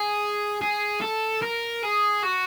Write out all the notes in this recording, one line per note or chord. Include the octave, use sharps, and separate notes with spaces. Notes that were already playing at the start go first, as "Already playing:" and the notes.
Already playing: G#4
G#4
A4
A#4
G#4
F#4